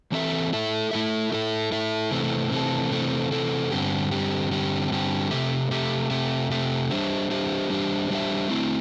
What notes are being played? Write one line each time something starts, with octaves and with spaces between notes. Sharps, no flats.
E3 C4 A4 E5
A3 E4 A4 E5
A3 E4 A4 E5
A3 E4 A4 E5
A3 E4 A4 E5
C3 E3 A3 C4 A4
C3 E3 A3 C4 A4
C3 E3 A3 C4 A4
C3 E3 A3 C4 A4
G2 D3 G3 C4 G4
G2 D3 G3 C4 G4
G2 D3 G3 C4 G4
G2 D3 G3 C4 G4
C3 A3 C4 G4 E5
C3 A3 C4 G4 E5
C3 A3 C4 G4 E5
C3 A3 C4 G4 E5
G3 D4 G4 C5 E5
G3 D4 G4 C5 E5
G3 D4 G4 C5 E5
G3 D4 G4 C5 E5
A3 C4 E4